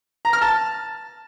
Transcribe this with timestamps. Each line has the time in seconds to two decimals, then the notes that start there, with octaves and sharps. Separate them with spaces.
0.25 A#5
0.33 F6
0.42 A5